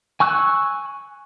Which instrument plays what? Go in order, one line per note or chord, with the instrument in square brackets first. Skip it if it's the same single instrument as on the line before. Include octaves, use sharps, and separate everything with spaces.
[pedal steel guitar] G#5 C#6 E6 F#6